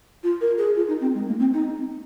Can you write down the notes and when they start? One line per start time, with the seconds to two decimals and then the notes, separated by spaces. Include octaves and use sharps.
0.23 F4
0.41 A#4
0.58 G#4
0.76 F4
0.88 D#4
1.01 C4
1.15 G#3
1.27 A#3
1.39 C4
1.53 D#4